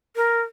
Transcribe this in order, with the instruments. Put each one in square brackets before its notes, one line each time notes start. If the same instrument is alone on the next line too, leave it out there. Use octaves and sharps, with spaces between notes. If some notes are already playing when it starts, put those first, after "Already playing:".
[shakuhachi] A#4